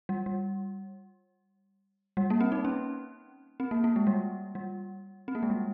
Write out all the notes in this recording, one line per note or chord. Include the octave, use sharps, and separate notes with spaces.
G3
G3
G3
A#3
C4
D#4
C#4
C4
A#3
A#3
G#3
G3
G3
C4
A#3
G#3
G3